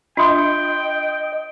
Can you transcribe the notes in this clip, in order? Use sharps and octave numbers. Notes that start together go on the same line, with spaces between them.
D4 F4 D#5 E5 G5 C6 D#6